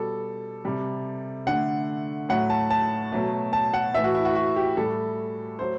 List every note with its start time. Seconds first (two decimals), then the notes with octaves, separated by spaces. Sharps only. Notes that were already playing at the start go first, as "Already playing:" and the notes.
Already playing: B2 G3 A4
0.65 C3 G3
1.47 D3 A3 F#5
2.29 A2 F#3 A3 F#5
2.50 A5
2.70 A5
3.12 B2 F#3 A3
3.53 A5
3.74 F#5
3.94 A2 E3 A3 E5
4.04 F#4
4.15 E4
4.25 F#4
4.35 F#4
4.56 G4
4.77 A2 G3 A4
5.59 F#3 A3 C5